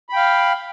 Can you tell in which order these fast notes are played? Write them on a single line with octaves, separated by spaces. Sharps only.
B5 G5 F5